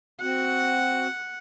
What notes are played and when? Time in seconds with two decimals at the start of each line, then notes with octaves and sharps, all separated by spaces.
0.21 C4 F#4 F#5